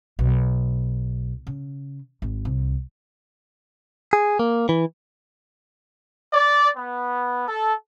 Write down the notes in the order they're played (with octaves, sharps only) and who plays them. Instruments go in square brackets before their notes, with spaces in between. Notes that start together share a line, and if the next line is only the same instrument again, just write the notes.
[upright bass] B1
C#3
G#1
C2
[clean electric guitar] G#4
A#3
E3
[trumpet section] D5
B3
A4